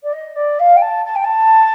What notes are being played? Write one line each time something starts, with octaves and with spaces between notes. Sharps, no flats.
D5
D#5
D5
F5
G5
A5
A5
G5
A5